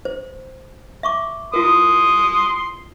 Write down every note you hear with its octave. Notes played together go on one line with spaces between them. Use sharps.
C5
E5 C#6 D6
E4 F4 A#4 C6 D#6